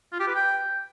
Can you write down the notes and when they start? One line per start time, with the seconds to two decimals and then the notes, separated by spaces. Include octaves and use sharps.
0.12 F4
0.20 G4
0.27 B4
0.35 G5